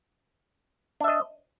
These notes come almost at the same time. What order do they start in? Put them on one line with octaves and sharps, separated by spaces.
D4 E5 D#5